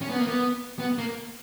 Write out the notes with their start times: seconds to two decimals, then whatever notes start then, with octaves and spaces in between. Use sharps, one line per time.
0.02 C#4
0.10 B3
0.19 A#3
0.27 B3
0.79 B3
0.98 A#3